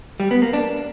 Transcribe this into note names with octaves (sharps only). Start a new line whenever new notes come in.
G3
B3
A#3
D4